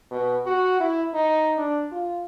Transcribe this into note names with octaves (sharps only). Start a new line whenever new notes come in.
B2
F#4
E4
D#4
D4
F4